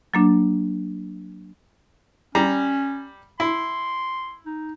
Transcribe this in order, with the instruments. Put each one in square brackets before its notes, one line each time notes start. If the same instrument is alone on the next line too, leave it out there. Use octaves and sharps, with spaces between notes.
[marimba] F#3 A#3 D4
[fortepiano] G3 A#5 [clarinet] C#4
[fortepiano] E4 [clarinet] C6
[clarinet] D#4